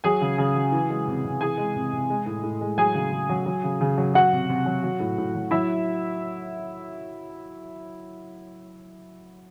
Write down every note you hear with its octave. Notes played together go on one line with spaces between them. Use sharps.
F#3 G#4 G#5
C#3
C#3
F#3
E3
G#3
C3
C3
E3 G#4 G#5
G#3
C3
C3
G#3
A2
A2
G#3
F#3 G#4 G#5
C#3
C#3
F#3
F#3
C#3
C#3
F#3
F#3 F#4 F#5
C3
C3
F#3
F#3
A2
A2
F#3
F#3 E4 E5